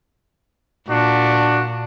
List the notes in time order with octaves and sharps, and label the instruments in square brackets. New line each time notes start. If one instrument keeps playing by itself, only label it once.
[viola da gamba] A#2 [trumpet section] D4 F#4